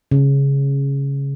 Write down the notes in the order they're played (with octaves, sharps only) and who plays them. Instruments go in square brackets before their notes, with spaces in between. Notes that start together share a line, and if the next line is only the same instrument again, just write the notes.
[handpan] C#3